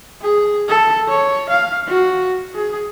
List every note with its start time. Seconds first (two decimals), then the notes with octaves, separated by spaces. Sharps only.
0.22 G#4
0.69 A4
1.09 C#5
1.50 F5
1.87 F#4
2.55 G#4